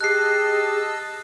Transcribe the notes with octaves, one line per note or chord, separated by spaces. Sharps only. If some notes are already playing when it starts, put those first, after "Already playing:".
G4 G#4 D#5 A5 E6 F#6 C7